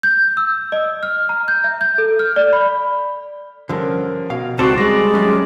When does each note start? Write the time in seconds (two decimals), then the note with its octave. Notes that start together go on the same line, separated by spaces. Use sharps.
0.03 G6
0.37 E6
0.72 D#5
1.03 F6
1.29 A#5
1.48 G6
1.64 E5
1.81 G6
1.98 A4
2.19 F6
2.36 D5
2.53 B5
3.69 G2 D3 F3 C#4 A#4
4.30 B2 F5
4.59 C#2 C4 D#4 F#4 G4 A4 D5 C7
4.78 G3 G#3 C4 D5 A#6
5.14 D#3 F#3 A3 C#4